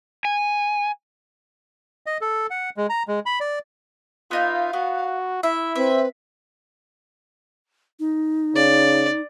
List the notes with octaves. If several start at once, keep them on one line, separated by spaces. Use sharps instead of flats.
G#5
D#5
A4
F#5
G#3
A#5
G#3
B5
D5
B3 D#4 F4 E5 F5
B3 F#4
E4 E5
C4 B4 E5
D#4
C#3 D5